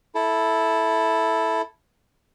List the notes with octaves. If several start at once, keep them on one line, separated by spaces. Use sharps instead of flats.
E4 A4